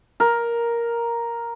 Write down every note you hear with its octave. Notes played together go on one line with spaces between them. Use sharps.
A#4